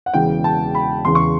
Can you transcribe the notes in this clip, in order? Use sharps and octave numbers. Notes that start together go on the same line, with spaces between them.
F#5
E1 E2 C#3 E3 G5
A5
B5
E2 C#3 E3 C6
C#6